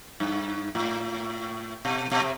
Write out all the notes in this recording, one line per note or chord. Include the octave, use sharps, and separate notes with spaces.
G2
A2
B2
B2
C3